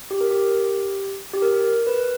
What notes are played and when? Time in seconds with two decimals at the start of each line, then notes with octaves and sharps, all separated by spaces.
0.11 G4
0.21 A#4
0.31 G4
1.33 G4
1.42 A#4
1.87 B4